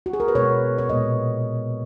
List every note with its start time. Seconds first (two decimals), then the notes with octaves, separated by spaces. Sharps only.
0.06 F#4
0.13 G#4
0.20 A#4
0.28 B4
0.35 B2 G#3 B3 C#5
0.78 C#5
0.89 A#2 G#3 B3 D#5